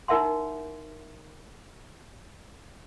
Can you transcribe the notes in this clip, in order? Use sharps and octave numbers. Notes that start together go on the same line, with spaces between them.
D#4 E4 A#4 E5 F#5 C6